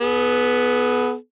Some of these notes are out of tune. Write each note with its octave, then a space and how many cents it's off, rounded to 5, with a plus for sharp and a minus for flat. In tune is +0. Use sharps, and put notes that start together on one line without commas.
B3 +0 G#4 +40